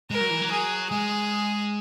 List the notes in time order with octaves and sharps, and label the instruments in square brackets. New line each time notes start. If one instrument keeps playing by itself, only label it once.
[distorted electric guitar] G#3 [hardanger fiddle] A#4
[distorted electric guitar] F#3
E3
F#3
[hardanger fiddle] G#4
[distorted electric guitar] G#3 [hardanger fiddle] G#4